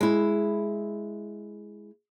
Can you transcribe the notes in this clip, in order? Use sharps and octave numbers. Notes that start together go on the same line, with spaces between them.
G#3 E4